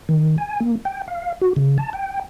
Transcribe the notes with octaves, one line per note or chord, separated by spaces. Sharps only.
D#3
G#5
A#3
G5
F5
F#4
C#3
A5
G5